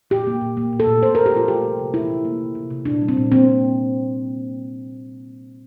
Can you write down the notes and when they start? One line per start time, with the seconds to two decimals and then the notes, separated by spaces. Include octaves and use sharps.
0.10 A#2 G4
0.27 A#3
0.41 A#2
0.57 A#3
0.73 A#2
0.80 A4
0.87 A#2
1.03 A#2 C5
1.15 A#2 A#4
1.26 G4
1.34 F3 F4
1.48 A3 G4
1.63 C3
1.79 C3
1.94 A#2 E4
2.10 A#2
2.25 A#3
2.41 C3
2.55 C3
2.70 C3
2.85 A#2 D4
3.02 G3
3.08 C4
3.17 A#2
3.32 A#3 C4